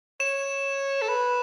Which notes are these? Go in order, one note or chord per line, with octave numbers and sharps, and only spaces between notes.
C#5 E7
A4
B4